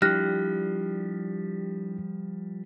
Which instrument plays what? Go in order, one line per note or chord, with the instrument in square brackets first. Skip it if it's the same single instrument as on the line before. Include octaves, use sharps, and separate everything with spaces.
[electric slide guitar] F3 G3 [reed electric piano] D4 E4 G4 [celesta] F6 F#6 A#6